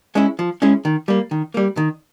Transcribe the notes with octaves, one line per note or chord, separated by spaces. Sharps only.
G#3 C#4 E4
F3
G#3 C#4 E4
D#3
G3 A#3
D#3
G3 A#3
D#3